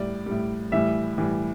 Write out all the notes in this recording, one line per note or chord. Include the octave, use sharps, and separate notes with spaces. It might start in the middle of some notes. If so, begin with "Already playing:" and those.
Already playing: A2 G3 D5
A2 G3
A2 E3 G3 E5
A2 E3 G3